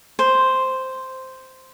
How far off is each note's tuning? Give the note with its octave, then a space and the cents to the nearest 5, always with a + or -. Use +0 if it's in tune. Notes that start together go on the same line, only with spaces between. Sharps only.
C5 -5